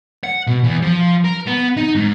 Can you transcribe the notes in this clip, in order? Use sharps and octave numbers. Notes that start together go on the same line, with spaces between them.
F#5
B2
E2
F3
A#4
B3
D#4
G#2